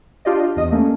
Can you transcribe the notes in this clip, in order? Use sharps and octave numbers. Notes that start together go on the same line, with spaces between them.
D4 F4 G4 D5 D#5
E2 D#5
A3 A#3 C#4